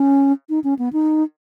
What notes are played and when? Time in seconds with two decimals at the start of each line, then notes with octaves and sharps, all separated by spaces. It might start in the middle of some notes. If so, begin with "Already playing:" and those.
Already playing: C#4
0.49 D#4
0.64 C#4
0.79 B3
0.93 D#4